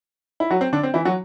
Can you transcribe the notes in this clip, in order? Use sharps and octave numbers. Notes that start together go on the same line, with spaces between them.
E4
F#3 F#4
C4
D3 D4
C4
E3 E4
F#3 F#4